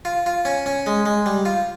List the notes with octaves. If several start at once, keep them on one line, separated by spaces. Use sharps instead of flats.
F4
F4
C#4
C#4
G#3
G#3
G3
F4